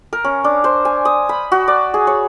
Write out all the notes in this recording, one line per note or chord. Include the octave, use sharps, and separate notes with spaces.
A#4
C#4
D4
C5
G#5
D#6
B5
F#4
D5
G#4
C#5